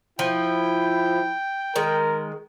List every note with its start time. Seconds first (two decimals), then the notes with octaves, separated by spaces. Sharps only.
0.19 F3 E4 G5
1.76 D#3 G#3 A#4